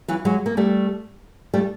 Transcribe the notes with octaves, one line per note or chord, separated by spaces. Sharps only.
E3 F#3
F#3 G#3
A#3
G3 A3
G3 A3